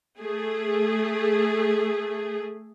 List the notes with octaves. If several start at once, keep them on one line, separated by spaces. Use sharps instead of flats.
A3 G#4